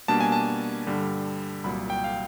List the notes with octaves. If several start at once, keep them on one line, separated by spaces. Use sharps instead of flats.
B2 G3 A#3 D4 A5
G#5
A5
G2 D3 G3
C2 A#2 F#3 B5
G5
F5